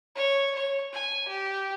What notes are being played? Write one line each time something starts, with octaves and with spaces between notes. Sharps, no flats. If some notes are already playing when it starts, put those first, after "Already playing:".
C#5
C#5
G#5
G4